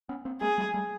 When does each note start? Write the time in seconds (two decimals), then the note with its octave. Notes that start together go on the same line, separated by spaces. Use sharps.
0.09 B3 C#4
0.25 A#3 C4
0.41 G#3 A#3 G#4
0.58 G3 A3
0.74 G3 A3